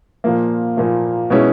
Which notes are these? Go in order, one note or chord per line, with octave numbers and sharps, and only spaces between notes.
A#2 F3 A#3
A#2 F3 A#3
B2 G#3 C#4 E4